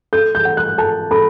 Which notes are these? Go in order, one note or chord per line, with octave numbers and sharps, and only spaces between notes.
A4 G6
G6
F#5
F#6
A4 A5
A4 B5